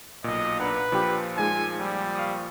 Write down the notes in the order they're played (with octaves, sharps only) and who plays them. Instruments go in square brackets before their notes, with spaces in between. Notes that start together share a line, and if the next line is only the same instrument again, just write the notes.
[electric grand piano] B1 A#2 [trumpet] D#5
[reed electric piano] D4 F#5 A#5 [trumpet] B4
[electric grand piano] A#2 F3 [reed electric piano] D4 G4
[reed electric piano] G#3 D#4 F4 [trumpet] G#5
[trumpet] G3
[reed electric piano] F5 C#6 D#6